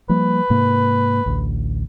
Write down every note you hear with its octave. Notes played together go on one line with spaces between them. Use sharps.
F3 G3 A#3 B4
G#2 C3 A#3
A1 D2